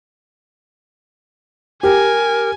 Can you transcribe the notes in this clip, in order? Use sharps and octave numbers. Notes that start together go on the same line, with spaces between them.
G4 A#4 G#5